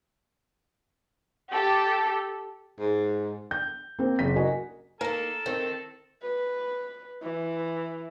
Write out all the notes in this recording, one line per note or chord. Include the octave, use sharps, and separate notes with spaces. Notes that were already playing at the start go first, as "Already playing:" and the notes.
G4 A4
G#2
G6
A#3 C4
F#1 B6
F#4 A#4 D#5 G#5
D#3 A#3 A4 A#4 A5
D#3 C4
B4
E3